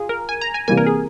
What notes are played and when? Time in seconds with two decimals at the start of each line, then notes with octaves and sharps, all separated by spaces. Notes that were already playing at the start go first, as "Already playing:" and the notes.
Already playing: F4 G#4
0.09 A#4
0.29 G#5
0.41 A#5
0.54 G#5
0.68 C3 E3 G3 A#3 G#5
0.77 A#4
0.87 G#4